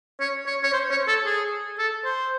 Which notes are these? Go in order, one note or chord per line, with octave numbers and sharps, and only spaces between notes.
C#5
C#5
C#5
C5
C#5
A4
G#4
A4
C5